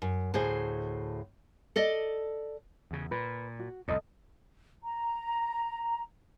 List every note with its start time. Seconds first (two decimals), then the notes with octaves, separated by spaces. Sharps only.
0.02 F#2
0.34 D2 A2 G#4 C5
1.76 A4 D5 D#5
2.91 E2 C#3
3.11 A#2 B4
3.59 F#4
3.88 C2 F2 A2 A4 D#5
4.84 A#5